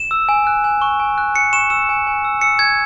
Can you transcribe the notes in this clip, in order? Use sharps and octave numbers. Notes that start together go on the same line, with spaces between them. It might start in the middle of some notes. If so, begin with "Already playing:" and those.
Already playing: E7
E6
G#5
F#6
G#5
C#6
G#5
F#6
G#5 C#7
C#6 E7
E6 E7
G#5
G#5
E6
E6 C#7
G#5 G#6